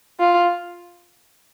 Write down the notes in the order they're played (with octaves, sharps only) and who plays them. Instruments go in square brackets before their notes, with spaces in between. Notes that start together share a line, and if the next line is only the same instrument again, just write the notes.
[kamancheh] F4